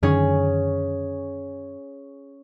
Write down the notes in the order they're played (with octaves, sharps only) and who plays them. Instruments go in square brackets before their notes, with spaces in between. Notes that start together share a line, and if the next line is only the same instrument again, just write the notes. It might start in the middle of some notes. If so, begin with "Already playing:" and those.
[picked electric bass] F#2 D3 D#3 [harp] C#4 G#4 C#5